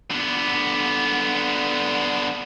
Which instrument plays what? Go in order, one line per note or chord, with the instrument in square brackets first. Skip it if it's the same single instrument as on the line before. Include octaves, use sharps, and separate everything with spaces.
[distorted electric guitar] D3 B3